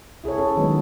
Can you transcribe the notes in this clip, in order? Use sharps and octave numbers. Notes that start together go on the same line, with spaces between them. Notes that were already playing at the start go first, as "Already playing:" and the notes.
E4 G#4 A4 C#5
C#4 A4
D#3 F#3 G#3 B3